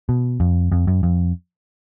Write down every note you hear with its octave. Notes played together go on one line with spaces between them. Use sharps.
B2
F2
F2
F#2
F2